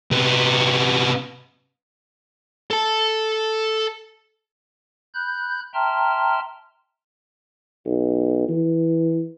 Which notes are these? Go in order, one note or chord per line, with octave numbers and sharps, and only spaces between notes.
C3 B3
A4 A5
B5 F#6 G6
E5 G5 A5 A#5 C6 F6
B1
E3